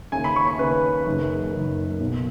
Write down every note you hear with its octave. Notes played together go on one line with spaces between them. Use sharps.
D#2 C#3 G#5
B5
C#6
B5
D#2 C#3 B4
F#1 F#2 D#3
F#1 F#2 D#3
B1 B2